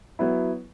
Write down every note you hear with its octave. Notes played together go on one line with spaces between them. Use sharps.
F#3 B3 E4